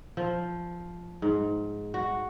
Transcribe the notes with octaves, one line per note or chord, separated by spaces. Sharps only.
F3
G#2
F#4